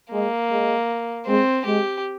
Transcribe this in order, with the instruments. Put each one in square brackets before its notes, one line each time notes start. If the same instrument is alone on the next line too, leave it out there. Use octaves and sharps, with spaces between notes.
[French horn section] G#3 [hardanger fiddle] A#3
[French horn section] G#3
[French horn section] G#3 [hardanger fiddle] C4
[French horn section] G#3 [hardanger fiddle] G4